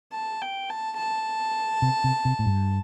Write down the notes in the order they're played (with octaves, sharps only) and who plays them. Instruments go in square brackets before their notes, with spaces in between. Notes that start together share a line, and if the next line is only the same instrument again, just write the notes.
[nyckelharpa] A5
G5
A5
A5
[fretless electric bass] C3
C3
C3
A2
G2